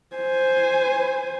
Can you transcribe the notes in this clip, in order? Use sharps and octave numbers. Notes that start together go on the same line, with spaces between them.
C5 G#5